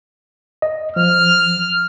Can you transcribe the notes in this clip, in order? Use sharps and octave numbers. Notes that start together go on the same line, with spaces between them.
D#5
F3 F6